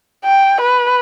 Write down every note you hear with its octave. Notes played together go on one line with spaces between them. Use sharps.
G5
B4